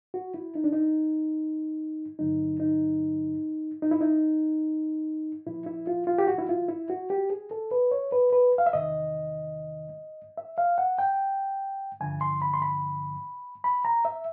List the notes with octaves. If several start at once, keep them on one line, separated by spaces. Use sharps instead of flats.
F#4
E4
D#4
D4
D#4
G2 D3 F#3 D#4
D#4
D#4
E4
D#4
A#2 F3 E4
E4
F4
F4
G4
F#4
E4
F4
E4
F#4
G4
G#4
A4
B4
C#5
B4
B4
F5
E5
E2 C3 D#3 D#5
E5
F5
F#5
G5
G2 D3 F3 G#5
C6
B5
C6
B5
B5
A#5
E5